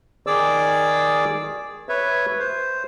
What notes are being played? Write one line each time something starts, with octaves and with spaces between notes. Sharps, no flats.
D#3 G#4 D5 D6 E6
B4 C#5 E5
C5